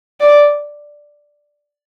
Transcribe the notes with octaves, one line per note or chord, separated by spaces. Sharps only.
D5